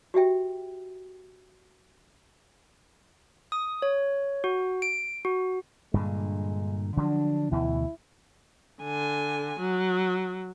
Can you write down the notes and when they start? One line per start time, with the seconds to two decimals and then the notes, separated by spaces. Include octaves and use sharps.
0.14 F#4 G4 E5 G5
3.52 D#6
3.82 C#5
4.44 F#4
4.82 D7
5.25 F#4
5.94 G2 A#2 D3 G#3
6.97 D3 F3 F#3 D4
7.52 D2 B2 E3 E4
8.83 D3 G#5
9.60 F#3